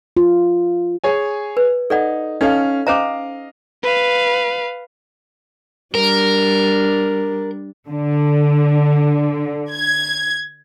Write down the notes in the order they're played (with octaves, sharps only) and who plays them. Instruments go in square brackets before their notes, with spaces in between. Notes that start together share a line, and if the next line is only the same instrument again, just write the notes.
[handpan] F4
[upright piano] G#4 C#5 G#5
[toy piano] B4
[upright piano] D#4 [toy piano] A4 D5 F#5
[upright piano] C#4 F5 [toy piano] D#4 A4 D#5
[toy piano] C#4 C5 A#5 [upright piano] D#5 F5 D6
[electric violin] B4 F5
[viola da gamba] G3 D4 [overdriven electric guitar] A#4
[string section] D3
G#6